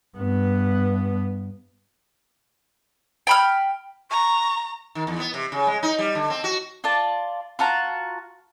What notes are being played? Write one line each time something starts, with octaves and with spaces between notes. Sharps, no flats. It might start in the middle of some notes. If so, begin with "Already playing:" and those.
G2 B3
G5 B5 F6
A#5 C#6
D#3
E2
B3
C3
C#3
G#3
D#4
G3
D3
C4
F#4
F4 D5 A5
F4 F#4 A5 A#5